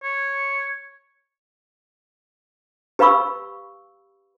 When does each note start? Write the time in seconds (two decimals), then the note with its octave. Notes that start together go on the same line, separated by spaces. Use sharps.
0.03 C#5
2.99 G4 B4 F5 B5 C#6 E6